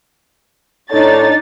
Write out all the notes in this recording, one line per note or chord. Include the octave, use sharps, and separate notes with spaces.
A2 D4 D#4 A4 C#5 A6